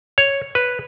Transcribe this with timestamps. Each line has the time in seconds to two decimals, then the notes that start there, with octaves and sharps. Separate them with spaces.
0.18 C#5
0.55 B4